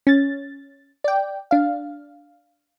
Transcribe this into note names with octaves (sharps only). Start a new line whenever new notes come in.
C#4 A6
D5 G5
D4 F5